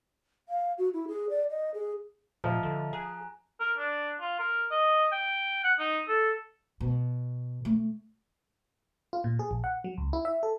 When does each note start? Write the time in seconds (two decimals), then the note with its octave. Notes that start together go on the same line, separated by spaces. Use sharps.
0.49 F5
0.78 F#4
0.93 E4
1.08 G#4
1.30 D5
1.50 D#5
1.74 G#4
2.44 A#2 F3 D#5 E5 A#5
2.63 D3
2.93 G#4 G#5 A#5 F#6
3.60 A#4
3.78 D4
4.21 F4
4.39 A#4
4.71 D#5
5.12 G5
5.64 F#5
5.79 D#4
6.08 A4
6.81 B2
7.65 A3
9.13 F4
9.24 A#2
9.39 G#4
9.51 A#1
9.64 F#5
9.84 F#3
9.98 C#2
10.13 E4
10.25 E5
10.43 A4